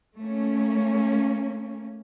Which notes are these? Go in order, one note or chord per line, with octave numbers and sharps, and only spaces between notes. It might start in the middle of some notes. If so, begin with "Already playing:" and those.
A3 A#3 C#4